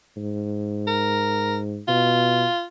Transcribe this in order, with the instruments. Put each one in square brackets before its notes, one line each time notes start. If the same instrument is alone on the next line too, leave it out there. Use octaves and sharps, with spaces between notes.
[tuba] G#2
[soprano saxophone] A#4
[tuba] B2 [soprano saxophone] F4